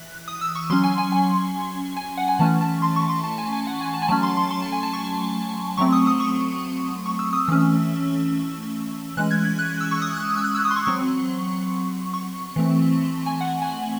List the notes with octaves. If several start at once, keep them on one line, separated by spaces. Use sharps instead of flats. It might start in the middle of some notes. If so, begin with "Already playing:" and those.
Already playing: E3 F#6
D#6
E6
C#6
F#3 C#4 C6
G#5
G#5
G#5
G#5
F#5
G#5
E3 A3 C#4 A5
A5
C6
C#6
C6
A5
G#5
G#5
F#5
G#5
A5
G#5
F#3 A3 C#4 A5
C6
C6
C6
A5
G#5
A5
C#6
F#3 A3 C4 C#6
D#6
D#6
C#6
C#6
E6
D#6
E3 A3 C#4 E6
E3 G#3 C#4 F#6
G#6
G#6
F#6
E6
C#6
D#6
F#6
E6
F#6
E6
D#6
C6
C#6
F#3 C4 C#6
C#6
E3 A3 C4
G#5
F#5
G#5